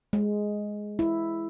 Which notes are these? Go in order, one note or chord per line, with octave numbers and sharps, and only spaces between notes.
G#3
E4